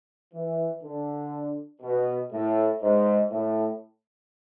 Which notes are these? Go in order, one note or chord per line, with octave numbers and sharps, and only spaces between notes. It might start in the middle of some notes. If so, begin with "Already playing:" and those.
E3
D3
B2
A2
G#2
A2